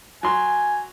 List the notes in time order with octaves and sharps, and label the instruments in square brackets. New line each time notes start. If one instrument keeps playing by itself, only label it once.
[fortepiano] F#3 C6 [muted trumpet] G#5